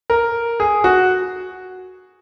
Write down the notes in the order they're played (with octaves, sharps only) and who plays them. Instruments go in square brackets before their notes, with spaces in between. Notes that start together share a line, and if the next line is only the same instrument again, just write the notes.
[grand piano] A#4
G#4
F#4